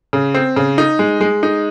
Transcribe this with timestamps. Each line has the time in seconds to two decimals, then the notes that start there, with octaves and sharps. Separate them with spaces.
0.13 C#3
0.34 C4
0.56 C#3
0.78 D#4
0.99 G#3
1.21 G#3
1.43 D#4